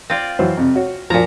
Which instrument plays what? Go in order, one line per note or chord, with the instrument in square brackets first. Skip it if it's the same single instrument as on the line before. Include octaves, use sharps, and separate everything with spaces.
[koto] C4 F4 D5
[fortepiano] E3 F#3 C5
F2 C3
F#4 C#5
[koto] A#2 A#5 [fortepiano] F3